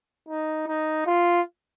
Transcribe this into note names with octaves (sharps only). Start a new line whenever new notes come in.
D#4
D#4
F4